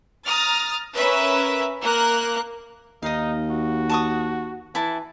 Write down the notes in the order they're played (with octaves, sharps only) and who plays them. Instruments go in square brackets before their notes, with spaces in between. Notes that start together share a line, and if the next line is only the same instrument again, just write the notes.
[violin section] A#5 D#6 F6 A6
C#4 A#4 B4 E5
A#3 A#4 F#6
[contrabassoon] D#2 [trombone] D#4 [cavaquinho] D#5 F5
[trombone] F#4
[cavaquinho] A5 C#6 D#6
[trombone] E3 [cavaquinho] E4 A5